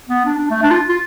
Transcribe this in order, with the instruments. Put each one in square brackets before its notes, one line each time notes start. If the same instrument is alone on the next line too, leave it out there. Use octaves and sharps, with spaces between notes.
[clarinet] B3
D4
D4
A3
D4
F4
F4